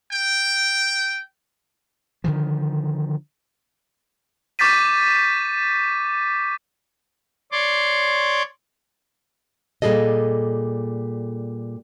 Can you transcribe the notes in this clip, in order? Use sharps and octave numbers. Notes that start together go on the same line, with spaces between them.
G5
D3 D#3 F3
C#6 D6 G6 A6 B6 D#7
C#5 D5 C6 D6
A#2 D#3 G3 G#4 A4 D#5